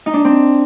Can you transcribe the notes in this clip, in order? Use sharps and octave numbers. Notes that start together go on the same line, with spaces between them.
D#4
D4
C4